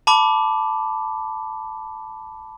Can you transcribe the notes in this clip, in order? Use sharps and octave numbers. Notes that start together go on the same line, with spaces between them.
A5 B5 D6